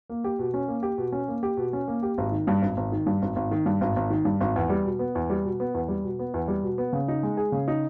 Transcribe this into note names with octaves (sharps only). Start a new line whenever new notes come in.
A#3
G4
B2
C#4
A#3
G4
B2
C#4
A#3
G4
B2
C#4
A#3
G4
G#1
D#3
G2
G#1
G#1
D#3
G2
G#1
G#1
D#3
G2
G#1
G#1
D#3
G2
G#1
E2
G3
B2
B3
E2
G3
B2
B3
E2
G3
B2
B3
E2
G3
B2
B3
C#3
D#4
G#3
G#4
C#3
D#4